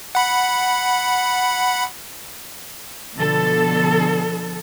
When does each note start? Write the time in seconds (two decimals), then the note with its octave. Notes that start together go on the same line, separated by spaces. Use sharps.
0.15 F#5 B5
3.17 B2 D3 F3 B3 A4